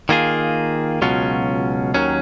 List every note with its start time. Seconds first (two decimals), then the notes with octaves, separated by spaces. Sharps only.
0.09 D#3 A#3 F4 G#4
1.02 C#2 B2 F#3 C#4 F4
1.94 D#2 D#3 F#3 C#4